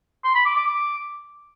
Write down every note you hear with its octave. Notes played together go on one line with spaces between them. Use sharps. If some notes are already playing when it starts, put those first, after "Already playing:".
C6
B5
D6
D6
D6